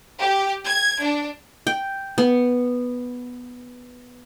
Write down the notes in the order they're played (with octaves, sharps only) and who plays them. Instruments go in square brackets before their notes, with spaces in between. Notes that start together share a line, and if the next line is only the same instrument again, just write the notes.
[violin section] G4
G#6
D4
[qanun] G5
B3